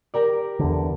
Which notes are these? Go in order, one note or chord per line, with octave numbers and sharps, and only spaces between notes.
G4 A#4 D5
E2 D3